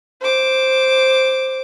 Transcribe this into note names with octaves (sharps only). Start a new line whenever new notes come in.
C5 D6